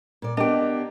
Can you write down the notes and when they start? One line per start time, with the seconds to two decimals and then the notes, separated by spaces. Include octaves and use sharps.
0.22 A#2 D5
0.37 A#3 B3 D4 G4 D#5